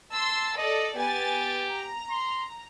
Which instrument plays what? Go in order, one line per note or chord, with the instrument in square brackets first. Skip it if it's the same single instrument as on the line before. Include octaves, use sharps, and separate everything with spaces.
[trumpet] A5 [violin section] C6 E6
[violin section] A4 D5 [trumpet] D#5
[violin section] B3 G#5 A6 [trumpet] G4
[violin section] A#5
[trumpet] C6